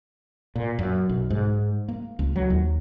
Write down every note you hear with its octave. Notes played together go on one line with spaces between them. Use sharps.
A#2
F#2
B1
G#2
A#3
C#2
F#3
D#2